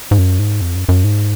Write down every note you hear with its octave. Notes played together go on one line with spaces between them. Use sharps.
G#2
F#2
G#2
F2
F#2
F#2
G#2